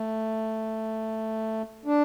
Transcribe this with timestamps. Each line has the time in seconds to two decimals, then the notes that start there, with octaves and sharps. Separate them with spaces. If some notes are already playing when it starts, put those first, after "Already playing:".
Already playing: A3
1.85 D4